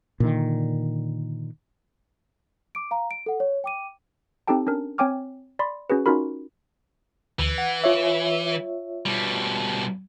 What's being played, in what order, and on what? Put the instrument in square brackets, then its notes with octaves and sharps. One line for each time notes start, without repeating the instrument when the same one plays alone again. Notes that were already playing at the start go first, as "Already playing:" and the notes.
[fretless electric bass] A#2 D3 D#3
[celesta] D6 D7
F5 A#5
D7
A4 F#5
C#5
G5 D6 D#7
[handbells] C4 D#4 G4 A4 G5 A5
C#4 D4 A#4
C4 C#5 G5 G#5 D6 F6
D5 B5 C6
C#4 F#4 G#4 B4
C#4 D#4 F4 F#4 A#4 B5
[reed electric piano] D2 [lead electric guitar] E3
[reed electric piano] F#5
F4 C#5 E5
[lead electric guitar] B2 G3